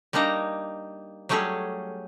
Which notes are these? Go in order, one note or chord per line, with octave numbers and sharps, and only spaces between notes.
G3 A#3 D4 D#4 A#5
F#3 G3 A3 C#4 G#4 A4